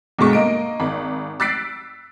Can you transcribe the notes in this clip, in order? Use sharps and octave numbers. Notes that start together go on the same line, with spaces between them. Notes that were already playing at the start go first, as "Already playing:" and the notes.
G1 B2 G#3 C#6
A#3 D#5 D7
G#1 B5
E6 F#6 A6 B6 C7 D7